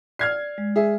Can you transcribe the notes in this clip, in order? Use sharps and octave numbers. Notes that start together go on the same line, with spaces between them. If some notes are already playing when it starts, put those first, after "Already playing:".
D5 F6 G#6 C7
G#3
G#4 E5